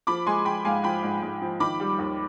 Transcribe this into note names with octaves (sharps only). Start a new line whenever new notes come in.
F3 B5 D6
G#3 G#5 C6
F3 G5 B5
G#2 F5 G#5
F3 G5 B5
G#2
G#2
F3
D#3 B5 D6
G3
D#2